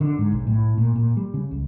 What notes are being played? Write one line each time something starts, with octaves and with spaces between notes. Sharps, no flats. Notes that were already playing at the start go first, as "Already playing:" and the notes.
D3
G#2
B1
A2
A#2
A#2
G3
C#3
C#2